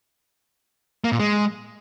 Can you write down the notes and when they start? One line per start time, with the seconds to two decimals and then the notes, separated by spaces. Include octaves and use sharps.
1.04 A#3
1.12 A#2
1.19 G#3